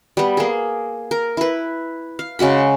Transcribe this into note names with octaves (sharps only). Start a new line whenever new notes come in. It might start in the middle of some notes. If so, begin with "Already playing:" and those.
G3 B3
A#3 G#4
A#4
E4 B4
F5
C#3 G#3 F#4 B5